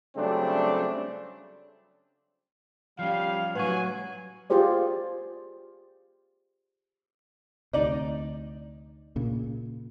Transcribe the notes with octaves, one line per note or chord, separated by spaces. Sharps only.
C#3 F#3 G3 A3 C4 D4
F3 G3 C#4 F5
A2 F#3 G3 B4 F#5 G#5 C#6
F4 G4 G#4 C5 D5
D2 C3 D#4 D5 D#5
A#2 C#3